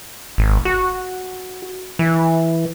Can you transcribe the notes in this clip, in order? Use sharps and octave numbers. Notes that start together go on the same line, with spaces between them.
G#1
F#4
E3